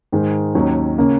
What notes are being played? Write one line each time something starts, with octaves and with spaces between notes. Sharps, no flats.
G#2 D#3 G#3
D#2 D#3 F#3 C#4
C#3 A#3 C#4